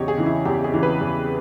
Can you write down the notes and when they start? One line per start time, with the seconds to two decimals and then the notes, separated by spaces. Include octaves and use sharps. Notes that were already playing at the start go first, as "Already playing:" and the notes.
Already playing: E2 C#3 E3 G4 C#5 D#5
0.08 G#4
0.17 C#3 E3
0.26 E4
0.45 E2 G4
0.64 G#4
0.74 C#3 E3
0.83 B4
1.01 E2